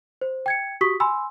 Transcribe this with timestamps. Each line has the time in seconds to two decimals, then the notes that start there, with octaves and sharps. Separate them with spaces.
0.21 C5
0.46 G5 G#6 C#7
0.81 F#4 G4 C#6 D#6 B6
1.00 G#5 B5 C6 E6